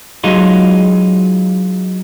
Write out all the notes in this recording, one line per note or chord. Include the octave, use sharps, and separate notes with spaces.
F#3 G#3 D#4 F4